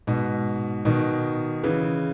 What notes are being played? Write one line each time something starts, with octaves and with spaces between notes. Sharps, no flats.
G#2 B2
B2 D#3
C#3 E3